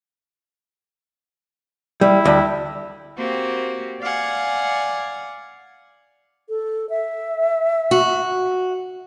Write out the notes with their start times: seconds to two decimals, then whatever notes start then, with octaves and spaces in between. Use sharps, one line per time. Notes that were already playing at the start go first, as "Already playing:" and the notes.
2.01 G3 E4
2.25 D2 G3
3.17 A#3 C4 F#4 G4
4.00 D5 F5 F#5 G#5
6.49 A4
6.90 E5
7.91 F#4